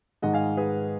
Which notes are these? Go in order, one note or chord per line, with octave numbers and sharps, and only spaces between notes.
G#2 D#3 G#3 D#5 F#5
F5 G#5
G#4 B4